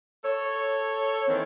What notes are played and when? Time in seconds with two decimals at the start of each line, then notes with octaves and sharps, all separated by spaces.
0.25 A4 C#5
1.28 D#3 E3 A#3 C4